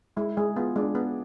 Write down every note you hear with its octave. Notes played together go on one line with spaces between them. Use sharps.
G#3 E4
G#3 G#4
B3 F4
G#3 D4
B3